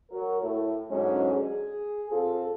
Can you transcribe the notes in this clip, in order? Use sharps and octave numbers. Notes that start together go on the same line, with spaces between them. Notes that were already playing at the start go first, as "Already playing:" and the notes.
F#3 A#4
A2
E2 G#2 D3 F#3 G#3 C#4
G#4
A#2 C4 F4 A4